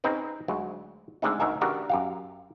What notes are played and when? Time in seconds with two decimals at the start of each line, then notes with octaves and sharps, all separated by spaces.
0.04 C4 C#4 D#4 G#4 B4
0.48 D2 F#3 G#3
1.22 D3 G#3 A3 C4 D#4
1.40 D2 D#4 A#4 E5 G#5
1.61 C#3 E3 D4 F#4 G4 A#4
1.90 F#2 G4 F5